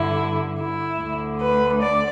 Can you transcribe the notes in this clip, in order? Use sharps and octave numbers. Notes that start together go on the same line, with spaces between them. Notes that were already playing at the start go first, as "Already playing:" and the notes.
Already playing: G2 D3 E4
E4
D2 D3
B4
D5